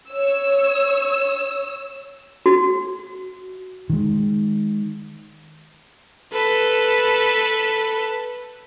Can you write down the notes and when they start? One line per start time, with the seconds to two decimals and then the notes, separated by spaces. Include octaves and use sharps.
0.12 C#5 E6
2.46 F#4
3.90 D#3 G#3
6.33 A4 B4